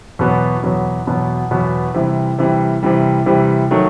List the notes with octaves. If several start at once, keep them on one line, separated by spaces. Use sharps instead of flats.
E2 B2 F#3 B3
E2 B2 F#3 B3
E2 B2 F#3 B3
E2 B2 F#3 B3
C3 E3 G3
C3 E3 G3
C3 E3 G3
C3 E3 G3
D#3 F#3 A3